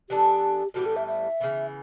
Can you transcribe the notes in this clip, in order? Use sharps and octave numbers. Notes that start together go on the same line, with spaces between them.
E3 B3 D4 G4 A4
A2 E3 G3 B3 F#4
A4
E5
E5
C#3 E3 B3